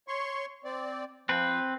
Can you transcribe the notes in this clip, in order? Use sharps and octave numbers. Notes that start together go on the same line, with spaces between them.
C#5 C6 C#6
C4 D5
F3 C4 B4